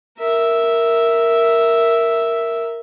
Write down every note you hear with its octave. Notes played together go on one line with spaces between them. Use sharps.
A#4 E5